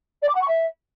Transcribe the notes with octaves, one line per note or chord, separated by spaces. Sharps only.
D5
D6
F#5
C#6
E5